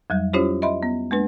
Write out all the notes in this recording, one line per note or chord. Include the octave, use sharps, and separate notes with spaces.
F2 F#3 G3
C#4 E4 F4 G4 C5 C#5
D#5 E5 B5 C6
B3
G#3 A#3 D4 B4